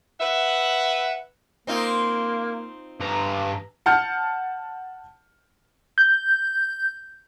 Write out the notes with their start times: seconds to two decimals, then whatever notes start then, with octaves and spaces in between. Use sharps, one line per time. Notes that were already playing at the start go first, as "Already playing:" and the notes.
0.21 B4 E5 F#5
1.67 A#3 C4 D#4 F4
3.00 G2 B4 A#5
3.86 F#5 A5 F6 G6 C#7
5.98 G6